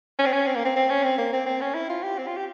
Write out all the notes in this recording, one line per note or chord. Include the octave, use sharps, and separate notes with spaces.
C#4
C4
C#4
C4
A#3
C4
C4
C#4
C4
A#3
C4
C4
C#4
E4
F4
G4
C4
F4
G4